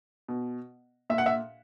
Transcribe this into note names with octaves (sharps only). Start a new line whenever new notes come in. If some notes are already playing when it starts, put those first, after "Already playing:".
B2
A#2 E5
F#5
E5